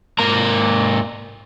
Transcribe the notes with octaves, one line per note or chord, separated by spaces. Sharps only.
G#2 A#3 A#4 A#5